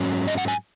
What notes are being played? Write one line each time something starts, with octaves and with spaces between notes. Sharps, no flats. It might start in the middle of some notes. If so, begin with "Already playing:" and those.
Already playing: G#2 F#3 C#4
D#5
F#5
G#5